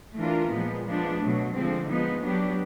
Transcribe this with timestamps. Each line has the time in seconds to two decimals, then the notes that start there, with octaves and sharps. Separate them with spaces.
0.18 E3 A3 D4 F4 A#4
0.51 A#2 F3 G#3 B3
0.86 F3 G#3 B3 D4
1.20 B2 F#3 A3
1.54 D3 F3 G#3 C4
1.88 F3 G#3 B3 D#4
2.23 F#3 B3 D4 G4